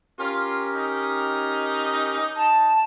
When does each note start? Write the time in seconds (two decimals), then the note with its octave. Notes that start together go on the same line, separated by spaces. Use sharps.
0.19 C#4 F4 G4 A#4
0.74 D#4
2.37 A5